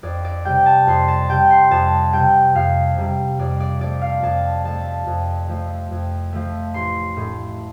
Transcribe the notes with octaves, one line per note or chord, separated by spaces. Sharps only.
F2 D5
D5
C3 G3 G5
A5
F2 C6
A5
C3 G3 G5
C6
F2 A5
C3 G3 G5
F2 F5
C3 G3
F2 D5
D5
F3 A3 D5
F5
F2 A5
F3 A3 A5
F2
F3 A3
F2
F3 A3
A1 C6
A2 A3